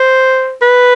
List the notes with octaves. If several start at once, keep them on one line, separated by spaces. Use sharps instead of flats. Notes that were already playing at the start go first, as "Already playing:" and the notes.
Already playing: C5
B4